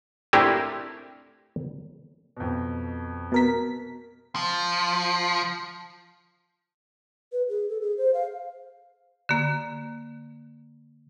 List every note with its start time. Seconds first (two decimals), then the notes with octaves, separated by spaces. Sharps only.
0.33 A3 C4 D4 E4 G4 A#4
2.37 F2 B2
3.32 B2 A#4 B6
4.36 F3
7.32 B4
7.49 G#4
7.69 A4
7.81 G#4
7.97 C5
8.14 F5
9.29 D3 A#3